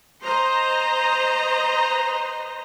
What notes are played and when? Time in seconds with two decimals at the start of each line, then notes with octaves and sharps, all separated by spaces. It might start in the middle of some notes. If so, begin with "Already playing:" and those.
0.25 C5 D#5 A#5